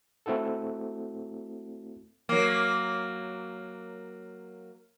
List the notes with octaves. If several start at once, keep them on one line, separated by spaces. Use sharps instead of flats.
A3 C4 E4 F#4 A4
F#3 A#3